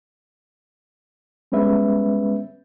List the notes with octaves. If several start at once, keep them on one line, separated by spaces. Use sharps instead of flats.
G3 G#3 B3 C#4 B4 E5